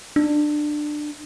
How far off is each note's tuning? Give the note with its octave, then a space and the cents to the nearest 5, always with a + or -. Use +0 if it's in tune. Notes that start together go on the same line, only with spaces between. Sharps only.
D4 +20